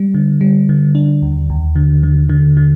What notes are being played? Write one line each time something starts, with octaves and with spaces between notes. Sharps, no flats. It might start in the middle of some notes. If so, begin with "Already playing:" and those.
Already playing: G3
D3
G3
D3
D4
D#2
D#2
D3
D3
D3
D3